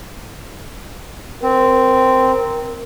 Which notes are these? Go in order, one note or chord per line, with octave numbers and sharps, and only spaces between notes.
C4 A#4